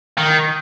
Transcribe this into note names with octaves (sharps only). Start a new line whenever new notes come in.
D#3